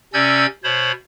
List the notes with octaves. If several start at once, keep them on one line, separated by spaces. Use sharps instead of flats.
C3 C#4 D5 E6 G6 G#6
B2 C5 C#5 B5